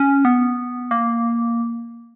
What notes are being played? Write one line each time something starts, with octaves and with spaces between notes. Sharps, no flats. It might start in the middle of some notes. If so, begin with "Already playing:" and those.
Already playing: C#4
B3
A#3